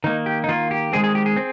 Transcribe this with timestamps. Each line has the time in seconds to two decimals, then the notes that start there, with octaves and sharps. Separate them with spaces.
0.04 D#3 A#3 D#4
0.26 G4
0.44 D#4
0.48 D#3 A#3 F4
0.71 G4
0.93 D#3 G#3 C4 G#4
1.04 G#4
1.15 G4
1.26 G#4
1.36 C4